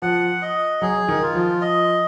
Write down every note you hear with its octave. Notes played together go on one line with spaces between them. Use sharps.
F3 F#5
D#5
F#3 G#4
D#3
F4
F3
D#5